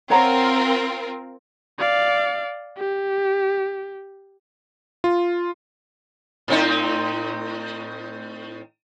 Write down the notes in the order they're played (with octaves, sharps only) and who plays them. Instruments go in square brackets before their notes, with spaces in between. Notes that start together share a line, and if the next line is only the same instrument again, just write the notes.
[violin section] C4 F4 A#4 [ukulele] C#5 F#5 A#5
[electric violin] D5 F5
G4
[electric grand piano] F4
[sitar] A2 C4 D#4